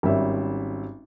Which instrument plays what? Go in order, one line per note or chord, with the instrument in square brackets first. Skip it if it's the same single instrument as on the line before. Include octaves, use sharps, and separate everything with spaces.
[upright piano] G#1 G3 C#4 E5